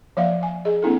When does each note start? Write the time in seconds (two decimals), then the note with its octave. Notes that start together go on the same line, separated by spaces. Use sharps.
0.17 F3 A#3 D5 E5 F5
0.43 G#5
0.65 G#4 D#5
0.82 A#3 C4 D4 E4 A4